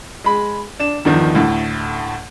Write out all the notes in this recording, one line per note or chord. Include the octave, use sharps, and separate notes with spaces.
G#3 B5
D4 E7
E2 G2 D#3 F3
D2 A2